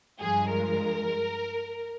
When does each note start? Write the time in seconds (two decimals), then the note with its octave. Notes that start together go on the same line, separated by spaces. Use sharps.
0.21 G2 F3 G#3 G#4
0.50 A#4